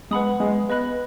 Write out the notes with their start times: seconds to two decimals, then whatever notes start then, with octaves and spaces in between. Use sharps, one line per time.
0.11 G#3 B4 F#5 B5 D#6
0.40 G#3
0.69 B3 B4 D#5 B5 F#6